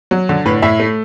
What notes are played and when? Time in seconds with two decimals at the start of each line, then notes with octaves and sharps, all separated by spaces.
0.11 F#3
0.29 D3
0.45 A2 B4
0.62 A2 E5
0.79 A3